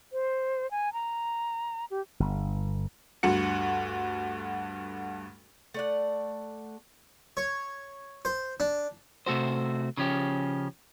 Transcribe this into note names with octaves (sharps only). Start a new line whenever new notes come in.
C5
G#5
A#5
G4
G1
D2 G2 F#4 C#7
A3 D5 F#5
C#5
C5
D4
C3 A3 F#4 C5
C#3 F3 C#4 G4